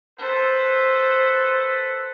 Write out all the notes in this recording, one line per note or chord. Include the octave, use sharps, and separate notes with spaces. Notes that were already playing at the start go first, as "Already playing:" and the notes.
A4 B4 C5